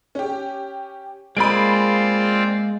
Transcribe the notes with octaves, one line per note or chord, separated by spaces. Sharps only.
C#4 G4
G#3 A#3 C4 F4 G#4 D5 B5 D7